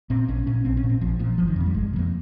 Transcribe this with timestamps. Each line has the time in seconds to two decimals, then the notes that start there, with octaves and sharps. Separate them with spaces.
0.10 A#2 C4
0.28 A#1 C#4
0.47 A#2 C#4
0.65 A#1 C4
0.77 C#4
0.84 A#2
0.89 C4
1.01 A#1 F3
1.19 A#2 F3
1.38 G1 F3
1.48 D#3
1.56 F2 C3
1.66 G3
1.74 G1 G#3
1.93 C3
1.96 F2 A#3